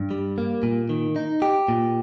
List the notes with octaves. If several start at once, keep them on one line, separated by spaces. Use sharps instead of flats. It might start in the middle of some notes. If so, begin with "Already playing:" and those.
Already playing: G2
G3
A#3
A#2
D#3
D#4
G4
A#2